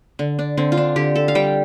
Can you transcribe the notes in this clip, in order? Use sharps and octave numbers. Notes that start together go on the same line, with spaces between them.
D3
D4
D3 C4
F4
D4
D3 G4
A4
F5
G3 G5